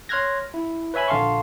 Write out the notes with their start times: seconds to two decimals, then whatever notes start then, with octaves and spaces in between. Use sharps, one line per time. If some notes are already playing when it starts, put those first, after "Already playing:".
0.09 C#5 C6 F6 F#6 G#6 A#6
0.54 E4
0.94 B4 C#5 E5 G#5 B5
1.08 A#1 D3 F5 A5 C6 C#6